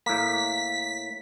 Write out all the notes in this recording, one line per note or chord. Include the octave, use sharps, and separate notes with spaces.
A2 A#3 B6